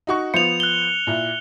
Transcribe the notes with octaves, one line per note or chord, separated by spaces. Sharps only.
D#4 F#4 C#6
F3 B3 C5 C#7 F7
F#6 G7
A#2 E4